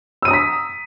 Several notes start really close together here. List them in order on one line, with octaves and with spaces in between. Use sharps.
E6 D#7 D#6 A#5 B6